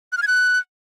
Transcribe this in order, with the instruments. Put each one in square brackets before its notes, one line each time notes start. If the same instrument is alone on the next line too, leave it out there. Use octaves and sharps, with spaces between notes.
[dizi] F#6
F6
G#6
F#6